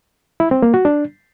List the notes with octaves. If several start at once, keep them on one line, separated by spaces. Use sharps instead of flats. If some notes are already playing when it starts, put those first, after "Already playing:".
E4
C4
A#3
F#4
D4